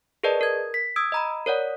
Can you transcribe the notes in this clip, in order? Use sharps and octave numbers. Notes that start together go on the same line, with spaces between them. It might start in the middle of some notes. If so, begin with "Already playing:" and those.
G#4 A#4 B4 D5 D#5 A5
A#4 G#6
B6
D#6 E6 G#6 D7
D#5 A#5 B5
A#4 C#5 D5 F#5